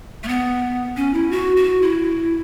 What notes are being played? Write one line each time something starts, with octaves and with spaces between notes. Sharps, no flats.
A3
B3
C#4
E4
F#4
F#4
E4